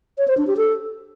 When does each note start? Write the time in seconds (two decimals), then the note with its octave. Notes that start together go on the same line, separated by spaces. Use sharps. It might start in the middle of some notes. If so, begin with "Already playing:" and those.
0.18 C#5
0.28 C5
0.37 D4
0.47 G4
0.57 A4